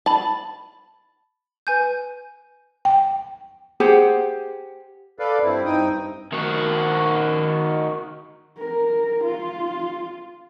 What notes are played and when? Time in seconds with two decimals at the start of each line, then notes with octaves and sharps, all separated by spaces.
0.06 A5 B5 A6
1.67 B4 G#5 G6
2.85 G5
3.80 G4 G#4 C5 F#5
5.19 A4 B4 D5 F5
5.43 G2 C4 E4
5.65 G2 C4 D#4 G5 D#6
6.33 D#3 F#4
8.59 A#4
9.24 F4